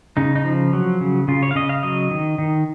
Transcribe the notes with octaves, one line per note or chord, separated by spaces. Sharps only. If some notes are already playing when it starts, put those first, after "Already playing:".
C#3 D#4
D#4
F3
F#3
C#3
C#3 F4
C#5
F5
C#3 D#5
F5
F#3 D#5
D#3
D#3